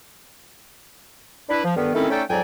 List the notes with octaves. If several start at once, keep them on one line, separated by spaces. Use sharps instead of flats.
D4 E4 B4
F3
G2 D3 D#3 B3
D#3 A3 C4 C#4 E4 A4
A3 C#4 D#4 A4 D5 G5
F2 G#2 F#3 D5 G5 G#5